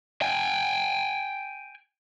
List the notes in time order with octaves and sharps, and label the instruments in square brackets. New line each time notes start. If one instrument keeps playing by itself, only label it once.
[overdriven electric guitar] G5 G#5